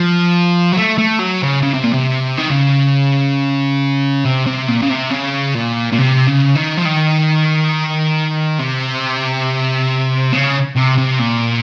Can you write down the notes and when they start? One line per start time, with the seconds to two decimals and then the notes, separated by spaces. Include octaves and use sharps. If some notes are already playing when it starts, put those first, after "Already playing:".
Already playing: F3
0.72 F#3
0.77 A3
0.98 A3
1.19 F#3
1.42 C#3
1.63 C#3
1.74 C3
1.84 A#2
1.93 C3
2.38 D#3
2.51 C#3
4.25 C3
4.46 C3
4.68 A#2
4.82 C#3
4.89 C3
5.10 C#3
5.55 A#2
5.93 A#2
5.98 C3
6.27 C#3
6.55 D#3
6.77 F3
6.85 D#3
8.59 C3
10.32 C#3
10.76 C3
10.98 C3
11.19 A#2